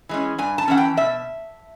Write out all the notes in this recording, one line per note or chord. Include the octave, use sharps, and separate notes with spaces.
E3 G#3 C#4
G2 G#5
A5
E3 G#3 C#4 F#5
G5
B2 E5